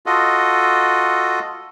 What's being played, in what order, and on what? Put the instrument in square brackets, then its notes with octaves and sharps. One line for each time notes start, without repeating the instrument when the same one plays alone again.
[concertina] F4 F#4 A4 D#5